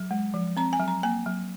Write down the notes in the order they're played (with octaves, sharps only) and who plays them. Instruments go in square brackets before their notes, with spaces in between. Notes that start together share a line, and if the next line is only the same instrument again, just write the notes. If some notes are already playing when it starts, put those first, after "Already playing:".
Already playing: [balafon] F#3
G#3
F3
C4 A#5
G#5
F#3
A#5
A#3 G#5
F#3